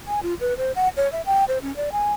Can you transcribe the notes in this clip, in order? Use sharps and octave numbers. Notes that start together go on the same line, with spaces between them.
G#5
F4
B4
C5
F#5
C#5
E5
G5
C5
C#4
D5
G#5